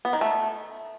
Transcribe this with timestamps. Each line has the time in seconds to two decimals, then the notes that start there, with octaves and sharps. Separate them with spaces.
0.05 B3
0.13 D#3
0.21 A3